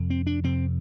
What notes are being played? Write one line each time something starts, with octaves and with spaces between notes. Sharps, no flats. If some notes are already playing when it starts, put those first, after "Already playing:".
Already playing: F2 C3
C4
D4
F2 C3 C4